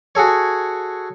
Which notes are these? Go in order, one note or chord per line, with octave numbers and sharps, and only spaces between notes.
F#4 G#4 A4 C#5